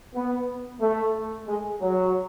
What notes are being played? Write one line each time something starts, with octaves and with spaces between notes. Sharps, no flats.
B3
A3
G#3
F#3